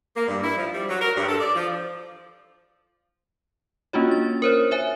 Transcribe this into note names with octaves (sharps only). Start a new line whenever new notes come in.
A#3
G2
E4
F3
G3
F#3
A#4
G2
A4
D5
F3
A#3 C#4 D4 F4 F#4 C#5
A6
A#4 C5 C#5
C#5 E5 G#5